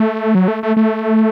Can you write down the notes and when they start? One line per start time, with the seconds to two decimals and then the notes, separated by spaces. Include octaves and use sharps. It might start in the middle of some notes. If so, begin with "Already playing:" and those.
Already playing: A3
0.35 F#3
0.48 A3
0.63 A3
0.77 A3